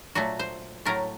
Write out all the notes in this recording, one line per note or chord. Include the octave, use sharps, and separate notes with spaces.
A#2 F#3 A3 F#4
C5
A2 F#3 A3 A#4